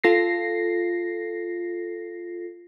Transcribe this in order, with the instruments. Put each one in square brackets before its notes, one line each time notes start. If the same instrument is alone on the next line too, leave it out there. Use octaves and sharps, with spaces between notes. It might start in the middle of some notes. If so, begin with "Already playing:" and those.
[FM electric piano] F4 A4 A#6 C7